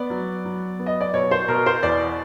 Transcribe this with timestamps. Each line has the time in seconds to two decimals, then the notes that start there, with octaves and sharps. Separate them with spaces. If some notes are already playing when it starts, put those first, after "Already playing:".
Already playing: B3 D5
0.10 F#3
0.45 F#3
0.79 B3
0.86 D#5
1.01 D5
1.14 B2 C#5
1.31 C5
1.48 B2 A#4
1.66 C5
1.83 E2 D5